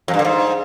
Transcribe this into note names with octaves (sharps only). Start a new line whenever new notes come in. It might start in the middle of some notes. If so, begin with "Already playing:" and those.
F2
G2
D3
G#2